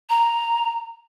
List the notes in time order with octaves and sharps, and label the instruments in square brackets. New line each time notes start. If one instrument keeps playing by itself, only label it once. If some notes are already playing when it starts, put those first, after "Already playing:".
[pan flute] A#5